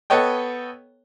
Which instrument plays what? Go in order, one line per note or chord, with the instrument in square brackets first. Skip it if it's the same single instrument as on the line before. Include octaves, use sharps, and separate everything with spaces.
[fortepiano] B3 A4 B4 C#5 D#5 G5